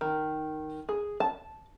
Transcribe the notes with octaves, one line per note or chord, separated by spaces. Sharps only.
D#3
G#4
A5